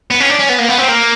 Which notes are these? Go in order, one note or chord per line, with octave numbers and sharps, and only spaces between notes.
B3
C#4
D4
C#4
B3
A#3
B3
C4
A#3